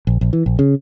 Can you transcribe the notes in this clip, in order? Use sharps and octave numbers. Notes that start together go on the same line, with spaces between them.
A#1
A#1
E3
A#1
C#3